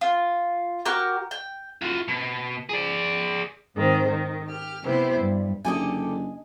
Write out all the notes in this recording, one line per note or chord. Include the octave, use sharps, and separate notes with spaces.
F4
F#4 G4 A#4 G5
G5
F4 F#4
B2
G#4 D5
G#2 D#3 C4 C5
D#3
G4 F6
C3 B3 E4 G4 C5
G2
F#1 D3 D4 G4 A4 D#5 G#5